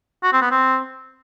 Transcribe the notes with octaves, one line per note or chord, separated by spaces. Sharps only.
F#4
C4
B3
C4